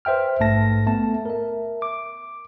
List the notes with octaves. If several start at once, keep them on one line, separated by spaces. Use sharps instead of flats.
B4 C5 E5 G5 F6
A#1 G#2 A3 A5 A#6
A3 B3 A5
A#4 E5
D6